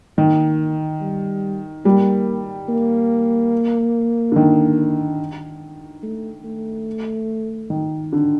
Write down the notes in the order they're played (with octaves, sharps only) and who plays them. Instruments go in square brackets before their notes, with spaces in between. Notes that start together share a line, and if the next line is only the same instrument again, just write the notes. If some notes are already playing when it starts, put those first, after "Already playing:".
[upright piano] D#3 [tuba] A#3
[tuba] G3
[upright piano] G3 [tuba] A#3
[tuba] A#3
[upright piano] D3
D#3
[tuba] A3
A3
[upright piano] D#3
D3